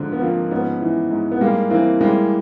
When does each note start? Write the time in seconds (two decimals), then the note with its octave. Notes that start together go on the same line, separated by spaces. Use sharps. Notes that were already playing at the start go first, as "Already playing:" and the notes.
Already playing: G#2 D3 F3
0.12 B3
0.21 F3 A#3 C4
0.51 G#2 B3 C#4
0.82 E3
1.11 G#2
1.32 B3
1.41 G3 G#3 A#3
1.70 E3 A#3 C4
2.01 G3 G#3 A#3